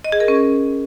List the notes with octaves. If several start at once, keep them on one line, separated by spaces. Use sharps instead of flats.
D#5
G#4
A#4
C#4